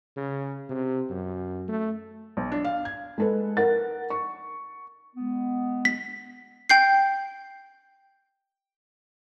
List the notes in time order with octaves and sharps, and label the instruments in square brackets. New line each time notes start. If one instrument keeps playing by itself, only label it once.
[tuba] C#3
C3
F#2
A3
[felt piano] B1
D4
F5
G#6
G#3 A4 B4
A#4 F#5 A6
C#6
[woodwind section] G#3 B3
[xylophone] B6
G5 G6 C7